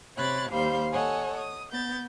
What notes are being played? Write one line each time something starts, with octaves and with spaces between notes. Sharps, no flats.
C3 C#5 B5 F#6 G#6 A6
D#2 G3 C5 F5 B5 G6
A4 C#5 D#5 F#5 G#5
D#6
B3 G6 A6